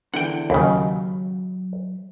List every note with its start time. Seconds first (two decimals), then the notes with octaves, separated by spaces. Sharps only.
0.14 E2 D3 E3 F#5 G5
0.50 D#2 C#3 F#3 B5